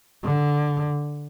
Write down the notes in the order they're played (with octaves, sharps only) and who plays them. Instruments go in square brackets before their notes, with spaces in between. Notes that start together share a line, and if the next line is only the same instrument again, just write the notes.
[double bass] D3